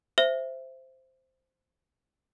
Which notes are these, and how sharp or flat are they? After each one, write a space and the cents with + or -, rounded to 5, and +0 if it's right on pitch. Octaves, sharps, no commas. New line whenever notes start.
C5 +0 E5 +10